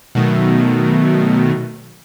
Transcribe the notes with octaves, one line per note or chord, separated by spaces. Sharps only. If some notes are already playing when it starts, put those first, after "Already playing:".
B2 D#3 F#3 A3